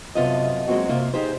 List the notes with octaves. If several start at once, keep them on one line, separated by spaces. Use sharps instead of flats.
F#2 C3 B3 F4 A4 D#5
F#3 G#3 A#3 C4 F#4
C3 A#3 F4
D#4 G4 G#4 C5